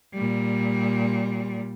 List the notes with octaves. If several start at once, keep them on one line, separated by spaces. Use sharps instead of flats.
A#2 G3